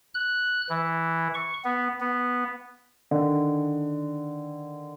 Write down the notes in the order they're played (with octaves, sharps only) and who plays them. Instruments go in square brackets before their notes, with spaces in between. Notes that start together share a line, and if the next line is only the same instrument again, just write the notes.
[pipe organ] F#6
E3
C#6
B3
B3
[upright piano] D3 D#3